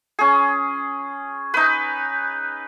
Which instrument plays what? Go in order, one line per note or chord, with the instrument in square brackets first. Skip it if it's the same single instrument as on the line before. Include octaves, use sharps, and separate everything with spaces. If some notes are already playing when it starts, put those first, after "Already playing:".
[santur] C#4 G#4
D#4 B4